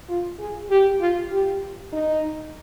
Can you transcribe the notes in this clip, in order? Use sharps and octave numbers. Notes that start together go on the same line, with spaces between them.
F4
G#4
G4
F4
G4
D#4